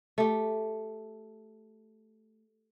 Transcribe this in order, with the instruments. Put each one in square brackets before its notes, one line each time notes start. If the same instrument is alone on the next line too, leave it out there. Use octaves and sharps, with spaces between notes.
[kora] A3 G4